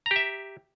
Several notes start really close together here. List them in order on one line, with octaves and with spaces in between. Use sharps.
A#5 G4 E5